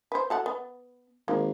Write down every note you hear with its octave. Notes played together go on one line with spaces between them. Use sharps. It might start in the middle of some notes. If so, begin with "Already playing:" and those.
B4 C5
F#4 A4 F#5
B3
G#1 A#3